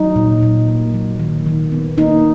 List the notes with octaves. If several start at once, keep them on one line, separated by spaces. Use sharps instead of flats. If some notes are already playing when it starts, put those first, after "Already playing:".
Already playing: F#3 D#4
A#2
A#2
A#3
F#3
D#3
D#3
B3
A#3 D#4